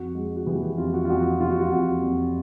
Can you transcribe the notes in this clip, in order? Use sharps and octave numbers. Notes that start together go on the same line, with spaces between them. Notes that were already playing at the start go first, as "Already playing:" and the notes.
Already playing: F2 F#4
G#3
F#4
E3 G4
G4
F2 F4
F#4
F4
F2 F#4
C3 F4
F#4
F4
F2 F#4
F2